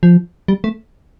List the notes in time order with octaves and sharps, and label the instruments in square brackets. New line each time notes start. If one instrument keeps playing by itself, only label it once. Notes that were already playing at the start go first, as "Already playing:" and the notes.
[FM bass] F3
G3
A3